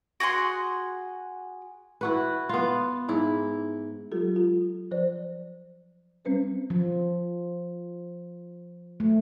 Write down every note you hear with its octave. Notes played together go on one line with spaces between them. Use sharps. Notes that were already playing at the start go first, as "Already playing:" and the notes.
F#4 G#4 F#5 C6
E4 F#4 B4
B3 F4
G#2 E4
F#3 G#3 F4 G4 A4
F4
F3 C5 D5
G3 C4 C#4 B4 C5
F3
A3